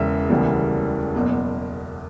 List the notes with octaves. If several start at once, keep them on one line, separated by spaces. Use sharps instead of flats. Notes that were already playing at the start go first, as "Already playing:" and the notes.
Already playing: E1 E2 C#3 E3 E5
E1 D2 C#3 E3 G3
F#1 E2 B2